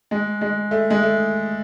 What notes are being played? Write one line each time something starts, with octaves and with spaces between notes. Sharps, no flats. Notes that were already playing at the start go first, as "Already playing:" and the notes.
G#3
G#3
A3
G#3
A3